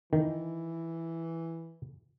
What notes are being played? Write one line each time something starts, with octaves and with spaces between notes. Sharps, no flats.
D#3 E3